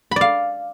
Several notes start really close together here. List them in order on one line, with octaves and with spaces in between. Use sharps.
B5 D5 F5